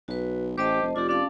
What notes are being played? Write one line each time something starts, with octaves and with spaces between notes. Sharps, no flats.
B1 F#4 B4
A1 G4 C5 D#5 A5
F1
F1 F4 G4 D5
C#4 D5 F5 A5